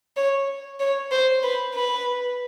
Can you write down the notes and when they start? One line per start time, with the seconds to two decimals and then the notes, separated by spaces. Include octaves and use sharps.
0.16 C#5
0.80 C#5
1.11 C5
1.43 B4
1.75 B4